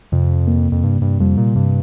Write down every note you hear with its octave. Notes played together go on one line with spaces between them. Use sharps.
F2 C3
A#3
F2
G2 C3
G2
F2 G3
A#2
G2 C3